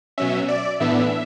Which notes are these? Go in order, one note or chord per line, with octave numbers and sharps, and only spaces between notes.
B2 F#3 C#4 E5
D5
A2 E3 B3 D4 E5